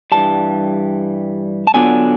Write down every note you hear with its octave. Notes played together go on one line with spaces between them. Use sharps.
G2 E3 G3 A5
A5
D3 F#3 B3 D4 F4 G#5